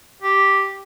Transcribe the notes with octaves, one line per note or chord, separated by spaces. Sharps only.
G4